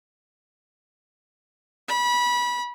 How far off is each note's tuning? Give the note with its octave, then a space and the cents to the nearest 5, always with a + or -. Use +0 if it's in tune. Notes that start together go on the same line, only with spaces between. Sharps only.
B5 -25